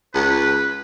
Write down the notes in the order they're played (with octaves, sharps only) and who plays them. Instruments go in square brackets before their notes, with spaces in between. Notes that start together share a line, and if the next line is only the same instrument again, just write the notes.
[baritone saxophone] C#2 [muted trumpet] B4